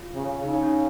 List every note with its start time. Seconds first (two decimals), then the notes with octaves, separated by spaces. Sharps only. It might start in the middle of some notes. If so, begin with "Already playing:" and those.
Already playing: F4
0.14 C#3
0.44 C#3 D#4
0.56 D#4
0.63 C#4